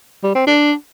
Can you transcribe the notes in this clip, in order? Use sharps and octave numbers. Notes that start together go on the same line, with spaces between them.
G3
C4
D4